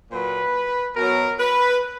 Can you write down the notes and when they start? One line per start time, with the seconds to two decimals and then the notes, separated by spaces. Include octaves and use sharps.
0.11 A#2 F#3 B4
0.96 B2 F#3 A#4
1.40 B4